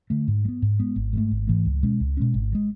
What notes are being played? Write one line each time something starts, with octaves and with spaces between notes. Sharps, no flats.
D3 A3
G#2
G#3
B3
G#2
G#3 B3
G#1
G#2 E3 A3
G#1
G#2 E3 A3
C#2
B2 G#3 C#4
C#2
B2 G#3 C#4
G#1
E3 G#3